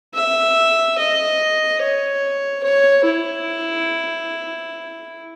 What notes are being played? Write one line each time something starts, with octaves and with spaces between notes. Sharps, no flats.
E5
D#5
C#5
C#5
E4